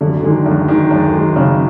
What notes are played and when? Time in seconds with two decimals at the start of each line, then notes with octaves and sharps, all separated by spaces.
0.01 F#2 D3
0.23 D3 D#3 G#3
0.46 F#2
0.68 D#3 G#3
0.91 F#2
1.14 D#3 G#3
1.36 F#2 C#3